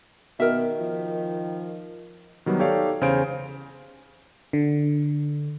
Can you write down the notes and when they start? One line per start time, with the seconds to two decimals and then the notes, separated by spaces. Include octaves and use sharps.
0.40 B2 D#3 A#4 E5
0.80 F3
2.46 D#3 F#3 G3 B3
2.59 D#4 G4 A4 C#5 D5 F5
3.01 E2 C#3 C5 F5 G#5 D7
4.53 D3